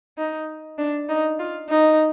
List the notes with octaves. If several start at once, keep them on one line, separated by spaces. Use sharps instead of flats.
D#4
D4
D#4
F4
D#4